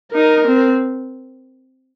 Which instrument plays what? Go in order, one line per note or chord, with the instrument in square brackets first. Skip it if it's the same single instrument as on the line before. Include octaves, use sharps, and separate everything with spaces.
[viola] D#4 [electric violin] A#4
[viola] C4